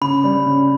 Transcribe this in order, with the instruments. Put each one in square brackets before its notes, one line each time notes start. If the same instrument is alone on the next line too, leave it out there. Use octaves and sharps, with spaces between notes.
[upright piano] C#3 [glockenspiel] B5
[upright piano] G3
C#3